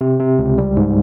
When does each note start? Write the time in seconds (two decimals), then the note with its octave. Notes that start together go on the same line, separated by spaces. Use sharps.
0.01 C3
0.20 C3
0.39 C#2
0.58 G3
0.77 G#2